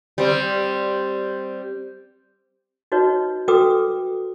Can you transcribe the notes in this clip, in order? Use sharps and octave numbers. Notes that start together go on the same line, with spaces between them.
G3 C4
D#4 F#4 B4 C#5 D#5
F#4 A4 B4 G5 D6 D#6